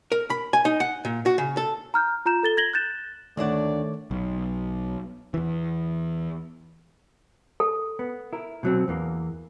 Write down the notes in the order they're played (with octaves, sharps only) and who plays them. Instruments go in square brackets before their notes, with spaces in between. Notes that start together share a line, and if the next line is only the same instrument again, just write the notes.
[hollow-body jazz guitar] A#4
B5
G#5
D#4
F#5
A#2
F#4
C#3
A4
[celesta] A#5 F6 G6
F4 A#5 G6 E7
A4 A6 G7
G#6 A#6 F#7 G7
F#6 G6 A6 E7
[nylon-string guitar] D2 D4 F#5 [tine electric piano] D#3 C#5 D6 [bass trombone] A3 [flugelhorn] D5
[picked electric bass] B1
E2 E3
[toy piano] A4
[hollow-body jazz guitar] B3
E4 A#4
B2 F#3 C4
E2 E3 A#3